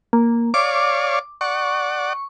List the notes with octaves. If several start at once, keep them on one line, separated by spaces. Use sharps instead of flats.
A#3
C#5 D5 F5 D6
D5 F#5 C#6